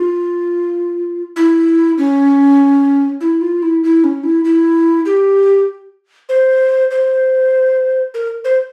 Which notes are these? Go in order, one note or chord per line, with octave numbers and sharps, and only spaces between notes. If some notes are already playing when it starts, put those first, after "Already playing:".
Already playing: F4
E4
C#4
E4
F4
E4
E4
C#4
E4
E4
G4
C5
C5
A#4
C5